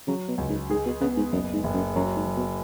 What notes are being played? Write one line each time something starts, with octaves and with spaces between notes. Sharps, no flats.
C#3 F#3
B2
C#2
G#2
G#2 G#4
B2
C#3 B3
G#2
F#1 F#2
G#2
F#1
F#2
F#2 F#3
G#2
F#3
B2